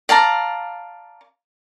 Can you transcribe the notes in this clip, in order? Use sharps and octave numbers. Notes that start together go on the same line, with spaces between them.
D5 F5 A5 A#5